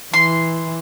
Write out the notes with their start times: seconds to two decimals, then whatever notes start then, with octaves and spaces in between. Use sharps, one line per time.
0.14 E3 C6